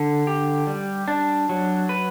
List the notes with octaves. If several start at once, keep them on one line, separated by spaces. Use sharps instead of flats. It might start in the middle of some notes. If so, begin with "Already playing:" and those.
Already playing: D3
G4
G3
D4
F#3
B4